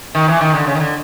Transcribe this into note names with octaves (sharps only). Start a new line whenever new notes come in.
D#3
E3
D#3
D3
C#3
D#3
D3